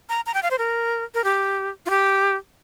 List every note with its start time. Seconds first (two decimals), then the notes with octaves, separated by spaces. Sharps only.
0.09 A#5
0.26 A#5
0.34 G5
0.43 F5
0.51 C5
0.58 A#4
1.14 A#4
1.24 G4
1.86 F4
1.90 G4